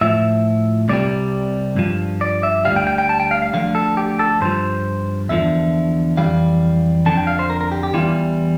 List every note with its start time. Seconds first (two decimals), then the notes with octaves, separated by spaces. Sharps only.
0.01 A2 F3 E5
0.89 C2 C3 G3 D5
1.76 G2 F3
2.21 D5
2.43 E5
2.65 D2 C3 G3 F5
2.76 G5
2.87 G5
2.98 G5
3.09 A5
3.20 G5
3.31 F5
3.42 F5
3.53 D2 D3 F3 F5
3.75 A4
3.97 G4
4.19 A4
4.41 G2 F3 C5
5.29 E2 D3 F3 E5
6.17 F2 E3 G3 F5
7.06 F2 D3 F3 A5
7.17 G5
7.27 F5
7.39 C5
7.50 A#4
7.61 A#4
7.72 G4
7.83 G4
7.94 E2 E3 G3 F4